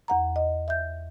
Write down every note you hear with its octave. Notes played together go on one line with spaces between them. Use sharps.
E2 F#5 A#5
D#5
E5 G6